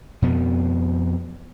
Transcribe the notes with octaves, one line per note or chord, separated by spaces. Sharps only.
F2 B2 B3